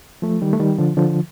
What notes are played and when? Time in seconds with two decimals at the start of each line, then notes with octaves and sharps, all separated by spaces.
0.22 F3 A3
0.42 D#3 G3
0.53 A3
0.60 D#3 G3
0.78 D3 F3
0.97 D3 F3